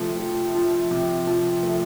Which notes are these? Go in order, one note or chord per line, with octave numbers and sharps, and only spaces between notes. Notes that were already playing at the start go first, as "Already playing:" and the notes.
Already playing: C3 F3 A3
F3
F3
C3
F3
A3